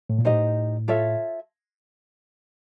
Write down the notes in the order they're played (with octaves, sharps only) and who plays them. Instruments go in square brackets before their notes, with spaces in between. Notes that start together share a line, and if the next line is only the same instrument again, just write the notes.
[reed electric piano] A2
A#2
[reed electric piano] A2 [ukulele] D#4 G4 C5 D#5
[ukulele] F4 A4 C#5 E5